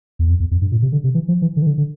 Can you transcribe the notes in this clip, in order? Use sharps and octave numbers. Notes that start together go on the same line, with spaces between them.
E2
F2
E2
F2
G2
A#2
C3
D3
C3
E3
F3
E3
D3
E3
D3
D3